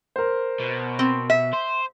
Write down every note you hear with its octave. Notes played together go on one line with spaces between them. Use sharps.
A#4 C5
B2
C4
E5
C5